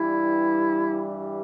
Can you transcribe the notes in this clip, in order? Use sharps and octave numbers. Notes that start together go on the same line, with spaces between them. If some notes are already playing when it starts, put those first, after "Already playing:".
Already playing: G2 E3 G3 E4